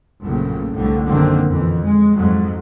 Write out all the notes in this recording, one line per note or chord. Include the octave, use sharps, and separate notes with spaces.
A#1 F#2 A2 C#3
C2 A2 D3
A#1 F#2 D3 D#3 A#3 C4
F2 E3
G#3
F2 G#2 F#3